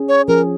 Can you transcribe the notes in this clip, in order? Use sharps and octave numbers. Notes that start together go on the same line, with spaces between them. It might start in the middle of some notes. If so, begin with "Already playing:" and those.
Already playing: C#4 G#4
C#5
F3 C#4 G#4 A#4